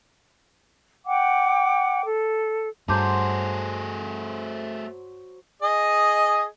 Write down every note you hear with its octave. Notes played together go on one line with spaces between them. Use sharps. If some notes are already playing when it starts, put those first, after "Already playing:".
F#5 G5 D6
A4
G2 F#3 A3 G#4 C5 A5 D6 G6
G#4 D#5